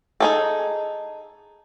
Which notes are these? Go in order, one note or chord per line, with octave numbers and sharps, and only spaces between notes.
D#4 G#4 A4